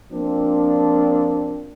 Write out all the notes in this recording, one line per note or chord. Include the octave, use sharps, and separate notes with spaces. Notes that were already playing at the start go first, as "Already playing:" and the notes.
F3 A#3 C4 D4